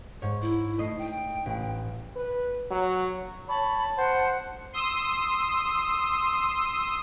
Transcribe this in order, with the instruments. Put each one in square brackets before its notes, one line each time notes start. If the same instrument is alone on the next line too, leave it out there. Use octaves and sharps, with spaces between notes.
[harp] G#2 C#5
[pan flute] E4
[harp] A3 D#5 C7
[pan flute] G5
[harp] A1
[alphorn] B4
F#3
[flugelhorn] C#5 [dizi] A5 [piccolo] B5
[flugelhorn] C5 [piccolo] F#5
[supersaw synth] C6 D#6 E6